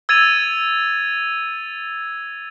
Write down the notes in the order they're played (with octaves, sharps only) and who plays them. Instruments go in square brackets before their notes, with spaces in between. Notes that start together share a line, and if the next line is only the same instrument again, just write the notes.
[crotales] E6 G#6 A6 D#7 F7